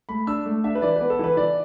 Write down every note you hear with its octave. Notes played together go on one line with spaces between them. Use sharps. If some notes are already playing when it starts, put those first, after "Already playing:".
A3 B5
D4 E6
A3
D4 E5
B4
E3 D5
B3 B4
A4
E3 B4
E3 D5